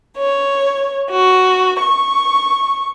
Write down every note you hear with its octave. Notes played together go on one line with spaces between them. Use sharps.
C#5
F#4
C#6